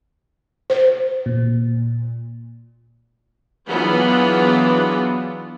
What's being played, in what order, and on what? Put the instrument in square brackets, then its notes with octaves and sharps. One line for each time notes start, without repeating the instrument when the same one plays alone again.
[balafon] C5
[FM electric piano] A#2
[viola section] E3 F#3 B3 D4 F4 G#4